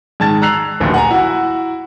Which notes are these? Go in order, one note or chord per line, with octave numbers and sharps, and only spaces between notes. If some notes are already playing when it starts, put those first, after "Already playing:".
G#2 D#3 A5 G#6 A6
A#5 E6 F#6 C7 F7
D1 A#1 D#2
F#5 G#5 A#5
E4 F#4